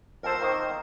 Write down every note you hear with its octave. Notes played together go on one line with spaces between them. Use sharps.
F2 A4 A#4 C5
D#3 A#3 C4